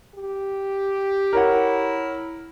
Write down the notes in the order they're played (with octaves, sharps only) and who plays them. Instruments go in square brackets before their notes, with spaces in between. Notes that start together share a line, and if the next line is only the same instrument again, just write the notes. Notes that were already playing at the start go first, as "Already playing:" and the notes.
[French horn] G4
[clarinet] E4 [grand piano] A#4 C#5 F#5